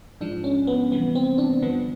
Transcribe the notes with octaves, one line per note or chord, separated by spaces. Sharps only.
G#2 F3 G#3 D4
C#4
B3
C3 E3 G3 B3
C4
D4
G2 D3 F3 B3